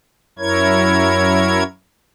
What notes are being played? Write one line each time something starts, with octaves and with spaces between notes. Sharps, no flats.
F#2 E4 A#4 C#5 G#6